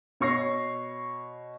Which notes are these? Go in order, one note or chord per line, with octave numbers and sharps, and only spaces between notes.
B2 C#5 C#6 A#6 C7